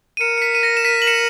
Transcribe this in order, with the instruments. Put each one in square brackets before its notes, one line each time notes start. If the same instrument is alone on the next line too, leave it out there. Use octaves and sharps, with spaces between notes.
[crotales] D#7
[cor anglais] A#4 [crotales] C#7 E7
[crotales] C#7
B6 D#7
D#7
A#6 C#7
E7
B6 D#7
F#7
C#7 E7